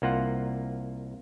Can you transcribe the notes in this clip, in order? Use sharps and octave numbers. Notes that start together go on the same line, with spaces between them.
C2 A#3 F4 F#5